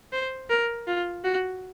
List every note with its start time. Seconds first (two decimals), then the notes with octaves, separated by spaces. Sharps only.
0.13 C5
0.50 A#4
0.87 F4
1.24 F#4